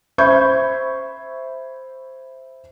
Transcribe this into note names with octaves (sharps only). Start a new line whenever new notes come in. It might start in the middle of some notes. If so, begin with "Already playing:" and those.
C5 E5 B5 C#6 G6 G#6